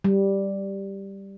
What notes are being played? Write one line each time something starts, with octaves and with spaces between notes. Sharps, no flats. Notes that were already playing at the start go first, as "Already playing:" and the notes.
G3